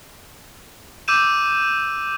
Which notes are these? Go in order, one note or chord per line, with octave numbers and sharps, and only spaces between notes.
D6 E6 G6 D#7 E7